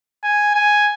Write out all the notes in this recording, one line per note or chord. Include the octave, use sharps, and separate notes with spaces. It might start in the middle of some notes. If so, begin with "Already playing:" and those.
G#5
G#5